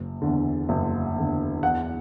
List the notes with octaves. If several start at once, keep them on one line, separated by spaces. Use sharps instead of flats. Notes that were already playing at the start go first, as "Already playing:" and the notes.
Already playing: F#1
E2 D3
F#1
E2 D3
E2 F#5